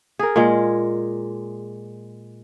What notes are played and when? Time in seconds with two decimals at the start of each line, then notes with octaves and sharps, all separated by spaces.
0.19 G#4 A#4
0.36 A#2 G#3